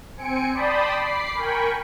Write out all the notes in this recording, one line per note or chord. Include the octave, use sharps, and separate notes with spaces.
C4 G#5 C#7 D7
D5 G5 A5 B5 C6 D#6
B5 D6 C7
A#4 G5 G#5 B5 C#6